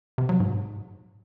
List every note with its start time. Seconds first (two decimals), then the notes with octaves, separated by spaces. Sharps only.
0.18 C3
0.29 F#3
0.40 G#2